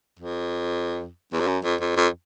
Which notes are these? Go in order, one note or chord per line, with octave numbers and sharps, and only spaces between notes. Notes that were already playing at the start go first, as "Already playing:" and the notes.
F2
E2
F2
F#2
F2
F2
F2